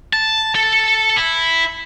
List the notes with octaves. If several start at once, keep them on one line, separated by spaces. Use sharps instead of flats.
A5
A4
E4